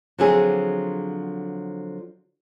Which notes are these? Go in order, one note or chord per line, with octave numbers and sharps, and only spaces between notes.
D3 F3 F#3 C4 G#4